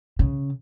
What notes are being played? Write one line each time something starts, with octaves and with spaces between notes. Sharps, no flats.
C#3